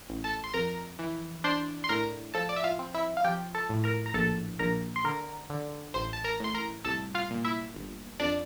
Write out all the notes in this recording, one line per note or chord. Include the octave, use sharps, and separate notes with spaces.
A1
A4 A5
C6
F2 A#4 A#5
E3
D4 C5 C6
C6
A2 A#4 A#5
F3 A4 A5
D5
E5
F4 F5
C4
E4 E5
F5
F3 G4 G5
A4 A5
A2
A#4 A#5
A#5
A#1 A4 A5
A#1 A#4 A#5
C6
D3 A#4 A#5
D3
A1 C5 C6
A5
A#4 A#5
A2 C6
A#4 A#5
C2 A4 A5
F4 F5
A#2
E4 E5
G1
F2 D4 D5